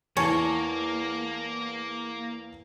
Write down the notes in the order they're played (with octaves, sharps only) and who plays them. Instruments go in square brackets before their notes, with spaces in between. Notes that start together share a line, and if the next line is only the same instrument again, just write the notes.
[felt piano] E2 G#5 A5 [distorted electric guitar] A#3 [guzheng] C#5